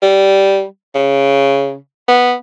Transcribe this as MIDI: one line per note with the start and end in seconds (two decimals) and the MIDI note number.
0.02 0.64 55
0.95 1.75 49
2.08 2.34 59